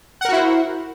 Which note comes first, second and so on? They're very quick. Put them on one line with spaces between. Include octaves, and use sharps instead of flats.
F#5 A#4 F#4 E4 C5